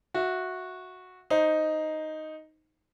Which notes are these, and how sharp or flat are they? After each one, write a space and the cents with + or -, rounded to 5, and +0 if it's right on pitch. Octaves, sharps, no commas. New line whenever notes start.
F#4 -10 E5 +0
D#4 +0 C5 +0